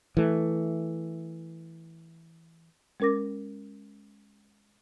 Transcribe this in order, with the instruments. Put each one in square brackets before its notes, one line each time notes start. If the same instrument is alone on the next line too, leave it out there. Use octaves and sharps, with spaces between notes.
[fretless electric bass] E3 A3
[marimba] G#3 C#4 A#4 D6 A#6